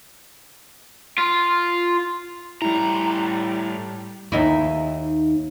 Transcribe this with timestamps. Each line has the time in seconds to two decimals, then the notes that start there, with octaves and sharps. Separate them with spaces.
1.18 F4
2.62 A2 G3 E4 A#5
4.32 D#2 D#4 E4